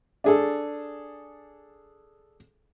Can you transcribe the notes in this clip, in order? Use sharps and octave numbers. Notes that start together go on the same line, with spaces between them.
D4 G#4 A4